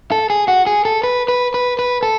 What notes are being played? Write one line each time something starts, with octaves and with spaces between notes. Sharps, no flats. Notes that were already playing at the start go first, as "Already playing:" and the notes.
A4
G#4
F#4
G#4
A4
B4
B4
B4
B4
A4